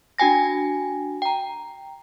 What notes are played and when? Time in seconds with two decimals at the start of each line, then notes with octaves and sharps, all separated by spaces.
0.18 D4 F#4 G5 G#5 A#6
1.22 G5 A#5